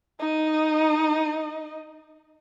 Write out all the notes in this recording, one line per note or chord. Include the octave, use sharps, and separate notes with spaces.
D#4 D#5